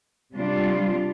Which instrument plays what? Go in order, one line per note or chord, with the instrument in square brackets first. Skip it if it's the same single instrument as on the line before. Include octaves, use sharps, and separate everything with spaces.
[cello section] C3 G3 D4 F4